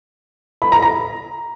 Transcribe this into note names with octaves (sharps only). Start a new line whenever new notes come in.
B5
A#5
A#5